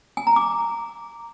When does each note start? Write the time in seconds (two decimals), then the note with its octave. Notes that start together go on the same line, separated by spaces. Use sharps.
0.17 G#5
0.27 A#5
0.36 D6